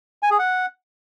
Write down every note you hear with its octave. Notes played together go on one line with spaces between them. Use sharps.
G#5
G#4
F#5